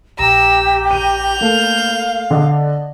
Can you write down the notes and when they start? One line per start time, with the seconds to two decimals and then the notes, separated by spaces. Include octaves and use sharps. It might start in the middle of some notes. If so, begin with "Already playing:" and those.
0.19 A#1 G4 A#5 E6 A#6
0.91 G6 D#7 F7
1.41 A3 A#3 A4 F5
2.31 D3 D5 D#5